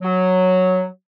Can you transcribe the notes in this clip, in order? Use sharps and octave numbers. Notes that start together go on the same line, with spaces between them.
F#3